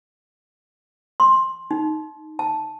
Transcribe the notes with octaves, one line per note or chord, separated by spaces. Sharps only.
C6
D#4
A5